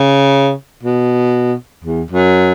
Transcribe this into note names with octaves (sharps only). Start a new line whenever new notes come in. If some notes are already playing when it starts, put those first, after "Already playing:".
Already playing: C#3
B2
E2
F#2